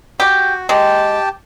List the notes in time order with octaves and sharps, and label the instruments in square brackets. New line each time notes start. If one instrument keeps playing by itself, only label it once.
[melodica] F#4 [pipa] G4
[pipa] G#3 [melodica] G4 G5 A5